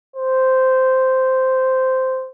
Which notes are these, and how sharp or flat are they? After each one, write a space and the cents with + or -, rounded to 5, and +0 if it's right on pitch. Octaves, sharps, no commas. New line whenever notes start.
C5 -10